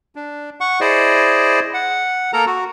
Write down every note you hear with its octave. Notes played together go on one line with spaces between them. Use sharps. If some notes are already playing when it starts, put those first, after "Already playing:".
D4
F#5 C#6
E4 G#4 C5 D5 D#5
F#5
A#3 A4 A#4 A#5
F#4